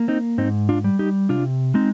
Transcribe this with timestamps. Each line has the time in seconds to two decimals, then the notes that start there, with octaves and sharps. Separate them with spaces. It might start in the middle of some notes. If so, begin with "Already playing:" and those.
Already playing: A#3
0.08 C4 D#4
0.38 G#2 C4 D#4
0.69 D4 F4
0.84 G3
0.99 D#4 G4
1.29 C3 D4 F4
1.74 G#3 C4 D#4